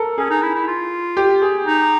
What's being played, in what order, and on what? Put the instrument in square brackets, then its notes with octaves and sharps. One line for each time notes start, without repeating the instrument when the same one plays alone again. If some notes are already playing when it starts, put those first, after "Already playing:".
Already playing: [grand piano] A4 A#4
[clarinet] C#4 [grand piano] G#4
[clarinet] D#4
E4
E4
F4
[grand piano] G4
G#4
[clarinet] D#4